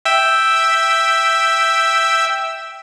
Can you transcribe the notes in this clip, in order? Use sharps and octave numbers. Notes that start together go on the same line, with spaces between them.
E5 G5 E6